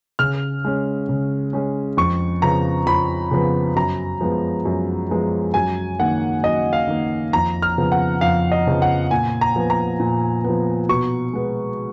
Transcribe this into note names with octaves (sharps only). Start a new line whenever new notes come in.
C#3 F6
G#3 C#4
C#3
G#3 C#4
F2 C#6
C#3 F3 B3 A#5
F2 B5
C#3 F3 B3
F#2 A#5
F3 G#3 B3
F#2
F3 G#3 B3
F#2 G#5
D#3 A#3 F#5
F#2 D#5
F5
D#3 A#3
F2 A#5
F6
C#3 F3 B3
F#5
F2 F5
D#5
C#3 F3 B3
F#5
A#2 G#5
A#5
F3 B3
A#5
A#2
B3
F3
B2 C#6
G#3 B3